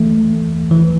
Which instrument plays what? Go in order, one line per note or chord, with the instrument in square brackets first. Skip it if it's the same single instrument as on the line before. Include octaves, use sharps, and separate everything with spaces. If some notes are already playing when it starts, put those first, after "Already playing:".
Already playing: [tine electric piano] E3 A3
E3